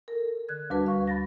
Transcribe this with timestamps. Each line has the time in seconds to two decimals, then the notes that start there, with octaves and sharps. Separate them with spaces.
0.08 A4 A#4
0.49 D3 F#6 G#6
0.70 D2 G3 D4 F#4 B4 A5
0.86 F5 C#6
1.07 B5 A6 A#6